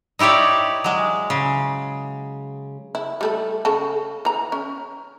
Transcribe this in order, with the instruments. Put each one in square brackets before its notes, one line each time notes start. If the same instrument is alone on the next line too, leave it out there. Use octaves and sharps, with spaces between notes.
[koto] D#4 E4 G4 C#5 D5
F#3 G#3
C#3
[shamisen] E4
G3 A3 E4
C#3 A4
E3 A#5
C#4